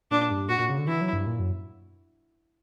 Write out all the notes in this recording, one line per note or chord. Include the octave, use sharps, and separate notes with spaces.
A#2 D4
G2
A#2 F#4
A#2
C#3
D3
E3 E4
F#3
G2
A#2
F#2